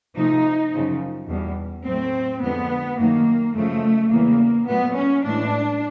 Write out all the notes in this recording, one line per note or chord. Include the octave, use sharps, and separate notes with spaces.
C3 F3 A3 D#4
F#2 C#3 F3
E2 B2 G3
A2 F#3 A3 C4
F2 D3 F3 G#3 B3
F#2 D#3 F#3 A3 A#3
F#2 C#3 F3 G#3 A3
E2 C#3 E3 G3 A#3
A#2 F#3 A3 B3
C#4
A2 E3 G#3 D4